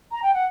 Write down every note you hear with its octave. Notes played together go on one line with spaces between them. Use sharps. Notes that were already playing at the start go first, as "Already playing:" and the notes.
A#5
G5
F#5